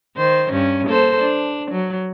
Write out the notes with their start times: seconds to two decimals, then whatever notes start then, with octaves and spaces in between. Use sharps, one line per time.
0.16 D#3 C5
0.50 G2 C#4
0.87 A#3 A4 C5
1.20 D4
1.71 F#3